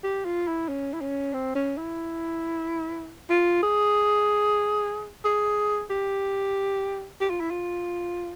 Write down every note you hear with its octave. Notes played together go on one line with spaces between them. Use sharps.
G4
F4
E4
C#4
E4
C#4
C4
C#4
E4
F4
G#4
G#4
G4
G4
F4
E4
F4